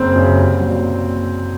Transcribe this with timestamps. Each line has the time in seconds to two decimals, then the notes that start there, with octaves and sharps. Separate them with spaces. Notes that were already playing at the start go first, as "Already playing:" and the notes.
Already playing: F#1 C4
0.15 F#2 C#3
0.37 C2
0.59 A#2 F#3